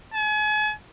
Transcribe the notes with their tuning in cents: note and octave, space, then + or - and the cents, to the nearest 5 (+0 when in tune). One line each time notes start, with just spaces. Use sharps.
G#5 +40